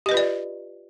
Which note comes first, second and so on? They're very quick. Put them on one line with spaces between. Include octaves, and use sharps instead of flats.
G4 D#5 B4 F4 D5